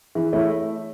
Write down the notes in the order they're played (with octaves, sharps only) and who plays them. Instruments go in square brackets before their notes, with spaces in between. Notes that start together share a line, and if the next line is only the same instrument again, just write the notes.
[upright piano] E3 [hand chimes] G#4
[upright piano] A3 E4 [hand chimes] C#5 E5